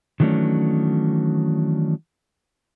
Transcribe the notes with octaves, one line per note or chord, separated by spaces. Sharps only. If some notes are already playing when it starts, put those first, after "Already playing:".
D#3 E3 F#3 A3 C#4 D4